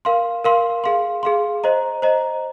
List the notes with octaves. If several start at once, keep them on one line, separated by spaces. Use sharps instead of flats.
A#4 F5 C6
A#4 F5 C6
G#4 F5 C6
G#4 F5 C6
C5 D#5 A#5
C5 D#5 A#5